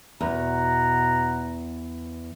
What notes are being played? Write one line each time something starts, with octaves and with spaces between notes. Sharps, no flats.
E2 B2 F#5 A#5